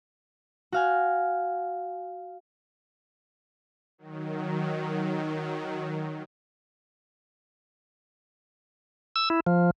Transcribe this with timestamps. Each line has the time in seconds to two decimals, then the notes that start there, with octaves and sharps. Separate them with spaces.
0.72 F#4 F5 G#5
3.98 D#3 F#3
9.16 E6
9.30 E4
9.47 F3